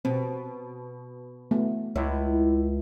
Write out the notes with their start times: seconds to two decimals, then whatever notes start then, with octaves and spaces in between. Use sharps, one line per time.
0.05 B2 C4
1.51 A3 B3
1.96 C#2 E4 C#5